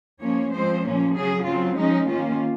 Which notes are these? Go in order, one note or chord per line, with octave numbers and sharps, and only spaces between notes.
F3 A#3 C#4 C#5
F3 G#3 C4 C5
A#2 F3 A#3 C#4
C#3 F#3 C#4 G#4
C#3 F#3 C4 F4
F3 G#3 C#4 D#4
D#3 A#3 C#4 F4